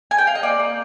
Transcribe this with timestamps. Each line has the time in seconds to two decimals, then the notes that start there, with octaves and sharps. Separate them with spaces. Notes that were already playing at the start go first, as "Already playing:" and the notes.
0.11 G#5
0.18 G5
0.27 F5
0.35 D#5
0.43 A#3 D5
0.59 A#3